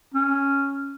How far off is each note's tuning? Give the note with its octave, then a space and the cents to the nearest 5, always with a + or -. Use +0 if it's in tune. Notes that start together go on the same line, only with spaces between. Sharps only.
C#4 +0